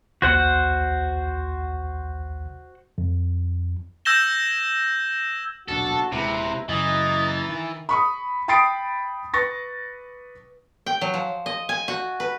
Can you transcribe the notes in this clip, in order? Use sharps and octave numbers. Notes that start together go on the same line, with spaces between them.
A#1 D#2 F#4 C5 F#5
F2
E6 G6 G#6 A#6 E7 G7
D#1 B1 D4 F#4 A4 A5
D#1 C3 G#3 E4 B4 A#5
F#2 C#3 E3 D#5 A#5 A6
D#3 E5
B5 C#6 D#6
G5 B5 D#6 A6 C7 D7
B4 C#6 A6 A#6
G5
F#3
F3
D#5
G#5
F#4
B4